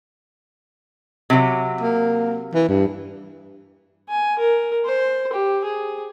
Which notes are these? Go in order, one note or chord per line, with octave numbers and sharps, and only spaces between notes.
C3 F#3
A#3
E3
G2
G#5
A#4
C5
G4
G#4